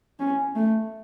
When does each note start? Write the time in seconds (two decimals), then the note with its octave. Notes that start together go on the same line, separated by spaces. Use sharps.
0.20 C#4
0.56 A3